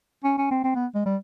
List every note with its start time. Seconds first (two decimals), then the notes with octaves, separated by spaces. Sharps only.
0.24 C#4
0.38 C#4
0.51 C4
0.64 C4
0.75 B3
0.95 G#3
1.06 G3